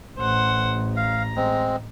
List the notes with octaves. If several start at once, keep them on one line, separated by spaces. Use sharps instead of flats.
A1 C5 F#5
F5 A#5
G#3 C4